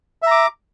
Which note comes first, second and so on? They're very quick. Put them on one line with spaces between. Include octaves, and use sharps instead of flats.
E5 A#5 D6